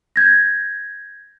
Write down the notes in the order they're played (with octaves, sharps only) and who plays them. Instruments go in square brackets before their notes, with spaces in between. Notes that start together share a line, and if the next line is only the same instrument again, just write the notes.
[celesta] G6 G#6 A#6